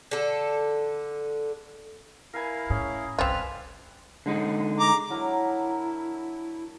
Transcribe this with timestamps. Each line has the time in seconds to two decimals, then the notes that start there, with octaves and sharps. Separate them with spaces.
0.11 D3 A4
2.33 E4 A#4 B4 F5 G#5
2.70 A2 C#4 G#4
3.19 G1 C2 C4 F4 B4 D5 G#5 F6
4.26 D3 G#3 D#4
4.80 A#5 D6
5.10 F#3 D4 E4 A#4